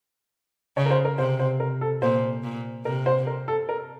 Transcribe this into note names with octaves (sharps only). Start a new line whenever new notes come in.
C#3 C#5
A#4
C5
A#4
C3 C5
C5
A#4
A4
A#2 C5
A#2
C3 A#4
C5
A#4
A4
A#4